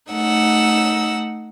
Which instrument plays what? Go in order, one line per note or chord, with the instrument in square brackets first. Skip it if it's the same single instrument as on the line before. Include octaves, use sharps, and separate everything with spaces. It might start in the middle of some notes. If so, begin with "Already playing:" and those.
[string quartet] A3 D#4 F#5 E6